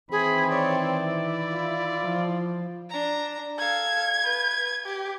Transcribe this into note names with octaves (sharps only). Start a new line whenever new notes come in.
D#3 E3 C4 G#4 B5
C#5 D5
E4
F4
F3
D4 A#5
A4 F5 G#6
B4
G4